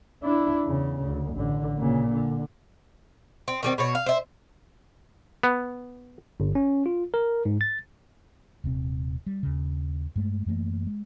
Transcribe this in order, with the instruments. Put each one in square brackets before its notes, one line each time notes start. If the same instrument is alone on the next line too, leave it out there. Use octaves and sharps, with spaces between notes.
[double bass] D4 E4
E2 C#3
D2
A1 D3
A#2 C#3
D3
[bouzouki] C4
D#3 G3 C4
B2 F#4 C#5
F5
C5 E5
[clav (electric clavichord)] B3
[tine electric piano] G1
C#4
F4
A#4
G#2
A6
[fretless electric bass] D#1 C3 C4
G3
D#2 C#3
G2 G#3 A3
F#2 E3 A3 A#3
G#3